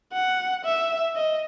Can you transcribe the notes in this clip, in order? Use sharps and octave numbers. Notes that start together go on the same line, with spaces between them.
F#5
E5
D#5